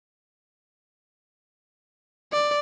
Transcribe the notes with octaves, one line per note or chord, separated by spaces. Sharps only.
D5